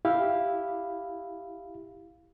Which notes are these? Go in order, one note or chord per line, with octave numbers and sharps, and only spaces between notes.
E4 G4 F5